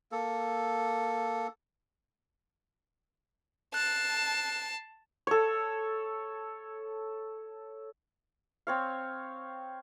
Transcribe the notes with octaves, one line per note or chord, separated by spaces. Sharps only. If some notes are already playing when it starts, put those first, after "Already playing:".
A#3 A4
A5 F#6 C7
A4 C#5
C4 C#5 F5